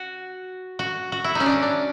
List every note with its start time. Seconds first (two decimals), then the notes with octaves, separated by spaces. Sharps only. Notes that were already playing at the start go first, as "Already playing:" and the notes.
Already playing: F#4
0.79 F#4
1.12 F#4
1.24 E4
1.35 C#4 D#4
1.46 D4
1.62 D4